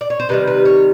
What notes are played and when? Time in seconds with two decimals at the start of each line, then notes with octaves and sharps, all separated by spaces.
0.01 D5
0.10 C#5
0.20 C5
0.29 C3 D#3 G3 B4
0.47 B4
0.65 C#5